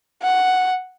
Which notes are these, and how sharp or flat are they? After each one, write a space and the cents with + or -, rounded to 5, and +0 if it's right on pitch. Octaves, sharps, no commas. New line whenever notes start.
F#5 +0